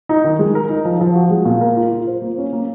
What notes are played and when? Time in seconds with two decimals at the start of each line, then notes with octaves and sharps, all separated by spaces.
0.09 D#4
0.24 D#3
0.39 G#3
0.55 A#4
0.69 D#4
0.85 F3
1.01 F3
1.16 F#4
1.31 G#3
1.45 A#2
1.61 A#4
1.77 F4
1.92 F4
2.07 C5
2.22 A#3
2.38 C#4
2.53 A#3